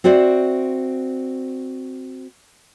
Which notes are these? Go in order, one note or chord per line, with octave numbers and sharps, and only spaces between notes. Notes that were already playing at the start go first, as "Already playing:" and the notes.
C4 F#4 C5 D5 E5